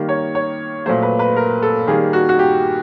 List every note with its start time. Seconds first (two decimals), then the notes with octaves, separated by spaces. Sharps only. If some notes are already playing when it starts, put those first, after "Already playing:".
Already playing: D#3 G3 A#3
0.09 C#5
0.35 C#5
0.86 A#2 F#3 A3 C5
1.02 B4
1.19 B4
1.36 A#4
1.62 A4
1.87 D#3 G3 A#3 G#4
2.13 F#4
2.29 F#4
2.39 G4